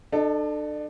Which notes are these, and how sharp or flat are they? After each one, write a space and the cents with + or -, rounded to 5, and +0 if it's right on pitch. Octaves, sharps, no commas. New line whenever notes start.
D4 +35 A4 +0 D#5 +0